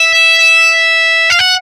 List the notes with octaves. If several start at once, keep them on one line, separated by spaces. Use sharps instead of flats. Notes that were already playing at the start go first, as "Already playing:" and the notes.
Already playing: E5
F5
F#5